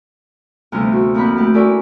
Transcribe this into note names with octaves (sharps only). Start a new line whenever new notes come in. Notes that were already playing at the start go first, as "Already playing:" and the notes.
D2 C3 E3 G3 B3 F4
F#4
F2 A#3 C4 E4 B5 F#6
A3 G4 F#5
C#4 E4 F#4 A4 A#4 D5